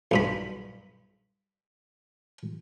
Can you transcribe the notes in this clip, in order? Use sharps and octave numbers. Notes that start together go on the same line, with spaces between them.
B1 G2 B5